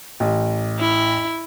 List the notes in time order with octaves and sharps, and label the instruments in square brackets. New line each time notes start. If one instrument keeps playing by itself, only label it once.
[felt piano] A1
[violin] E4